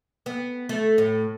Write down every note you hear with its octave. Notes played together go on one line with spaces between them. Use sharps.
B3
A3
A2